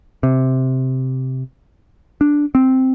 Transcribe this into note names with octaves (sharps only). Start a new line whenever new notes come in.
C3
D4
C4